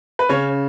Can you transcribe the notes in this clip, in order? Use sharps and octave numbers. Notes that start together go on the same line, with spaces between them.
B4
C#3 C#4 C#5